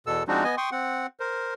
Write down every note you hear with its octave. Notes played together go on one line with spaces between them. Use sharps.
E2 B2 A4 E6
F3 G#3 C4 D4 D#4 F#4
B3 D#5 G#5
G5 C6 C#6 D#6
C4 F#5
A#4 C5